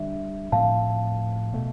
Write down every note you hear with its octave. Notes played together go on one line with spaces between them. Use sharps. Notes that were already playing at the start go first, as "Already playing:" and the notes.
Already playing: D3 G3 D4 E5
A2 F3 C4 F5 A5
B2 A3